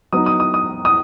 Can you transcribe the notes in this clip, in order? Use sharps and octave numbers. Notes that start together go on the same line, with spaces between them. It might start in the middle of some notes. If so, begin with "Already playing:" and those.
F#3 B3 D#4 D#6
D#6
D#6
D#6
D#6